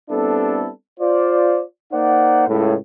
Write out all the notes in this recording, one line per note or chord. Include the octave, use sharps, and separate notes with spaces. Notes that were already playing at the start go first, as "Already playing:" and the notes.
G3 B3 C4 D4 E4 A4
F4 C5 D5
A#3 D#4 C5 D5 F#5
C#2 A2